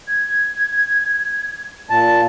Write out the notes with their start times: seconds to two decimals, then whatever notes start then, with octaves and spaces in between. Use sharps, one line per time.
0.08 G#6
1.90 A#2 A5